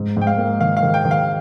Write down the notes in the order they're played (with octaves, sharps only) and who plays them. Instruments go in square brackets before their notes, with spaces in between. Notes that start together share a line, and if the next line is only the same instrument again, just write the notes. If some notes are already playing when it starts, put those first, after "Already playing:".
Already playing: [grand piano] G#2
[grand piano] G#2 [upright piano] G5
[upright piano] F5
[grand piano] A#3
[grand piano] D#3 [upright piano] F5
[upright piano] F5
[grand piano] D#3
[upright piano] G5
[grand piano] D#3
[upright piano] F5